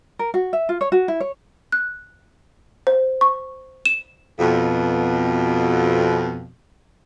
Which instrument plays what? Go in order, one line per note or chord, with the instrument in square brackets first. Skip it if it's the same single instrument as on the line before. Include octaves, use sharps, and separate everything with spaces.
[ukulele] A#4
F#4
E5
F4
C#5
F#4
E4
C#5
[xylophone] F#6
C5
C#6
E7
[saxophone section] F2 B2